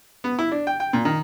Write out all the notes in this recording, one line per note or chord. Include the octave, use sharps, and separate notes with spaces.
B3
E4
D4
G5
G5
A#2
D#3